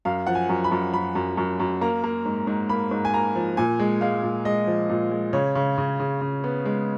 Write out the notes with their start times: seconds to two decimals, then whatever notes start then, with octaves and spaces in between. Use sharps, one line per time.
0.05 F#2 F5
0.27 F3 F#5
0.35 G#5
0.49 F#2
0.64 B5
0.72 F#2
0.93 F#2 B5
1.15 F#2
1.37 F#2
1.60 F#2
1.81 A#3 A#5
2.04 A#3
2.25 G#2
2.47 G#2
2.69 A#3 B5
2.91 G#2
3.05 G#5
3.13 A#3 A#5
3.36 F3
3.57 A#2 G#5
3.79 G#3
4.01 G#3 F5
4.23 A#2
4.45 G#3 D#5
4.67 F3
4.89 A#2
5.11 G#3
5.33 C#3 C#5
5.55 C#3
5.78 C#3
6.00 C#3
6.21 C#3
6.44 B3
6.65 G#3